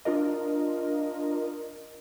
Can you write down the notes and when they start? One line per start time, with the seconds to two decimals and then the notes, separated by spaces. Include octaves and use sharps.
0.05 D4 F4 A#4 D#5